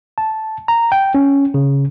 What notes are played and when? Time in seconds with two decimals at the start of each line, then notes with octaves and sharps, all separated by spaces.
0.18 A5
0.68 A#5
0.92 G5
1.15 C#4
1.54 C#3